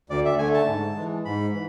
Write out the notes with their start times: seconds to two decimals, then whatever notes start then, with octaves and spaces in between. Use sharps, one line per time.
0.10 D2 D5
0.25 E5
0.39 D3 A3 G#5
0.54 A5
0.67 G#2
0.96 E3 G#3
1.25 G#2 B5
1.54 E3